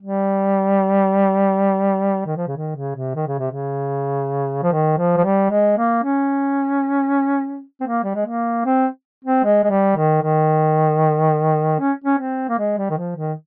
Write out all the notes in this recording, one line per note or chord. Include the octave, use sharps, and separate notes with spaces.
G3
D#3
F3
C#3
D#3
C#3
C3
D#3
C#3
C3
C#3
F3
D#3
F3
F3
G3
G#3
A#3
C#4
C4
A#3
G3
G#3
A#3
C4
C4
G#3
G#3
G3
D#3
D#3
C#4
C#4
C4
A#3
G#3
G3
D#3
F3
D#3